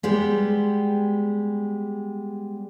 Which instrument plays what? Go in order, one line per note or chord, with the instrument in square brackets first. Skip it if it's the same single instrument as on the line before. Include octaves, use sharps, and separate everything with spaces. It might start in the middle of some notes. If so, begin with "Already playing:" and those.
[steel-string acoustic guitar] G3 G#3 B3 G4